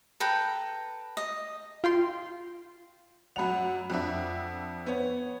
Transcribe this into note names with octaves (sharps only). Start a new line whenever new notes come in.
A4 B4 G5 A#5
D#5
F4 G5 C6
F#2 F#5 B5 F7
F2 D4 E5
B3 C#5